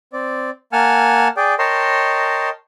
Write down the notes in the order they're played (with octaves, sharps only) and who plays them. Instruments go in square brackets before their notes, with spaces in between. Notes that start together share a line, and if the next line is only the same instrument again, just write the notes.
[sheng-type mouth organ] C4 D5
A#3 F#5 G#5 A5 F6
G#4 D5 G5
A#4 C#5 D#5 G5 A5 C6